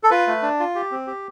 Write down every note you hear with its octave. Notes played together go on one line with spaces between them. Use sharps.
A4
F4 B4
A3
D4
F4
G4
C4
G4